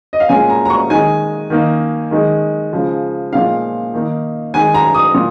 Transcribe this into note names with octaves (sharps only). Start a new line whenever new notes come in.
D#5
F5
A#2 G#3 C#4 G#5
A#5
A#5
C#6
D#3 G#3 D#4 G#5
D#3 A#3 D#4
D#3 G#3 D#4
C#3 F3 G#3
A#2 F3 G#3 D#4 F5
D#3 A#3 D#4
D#3 G#3 D#4 G#5
A#5
D#6
A#2